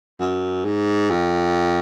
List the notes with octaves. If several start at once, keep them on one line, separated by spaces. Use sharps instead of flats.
F#2
G#2
F2